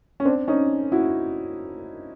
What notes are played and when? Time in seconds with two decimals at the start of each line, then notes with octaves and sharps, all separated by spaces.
0.20 C#4
0.25 C4 D4
0.48 C#4 D#4
0.92 E4 F#4